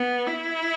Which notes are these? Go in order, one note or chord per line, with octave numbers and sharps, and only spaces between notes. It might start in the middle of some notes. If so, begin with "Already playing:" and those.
Already playing: B3
E4